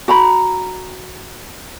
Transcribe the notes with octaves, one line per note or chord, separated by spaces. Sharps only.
F#4 A#5 B5